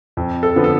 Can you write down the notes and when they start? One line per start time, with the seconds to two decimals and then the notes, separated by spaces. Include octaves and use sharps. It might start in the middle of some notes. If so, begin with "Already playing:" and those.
0.17 F2
0.43 A4
0.56 D3 F3 B3
0.64 A4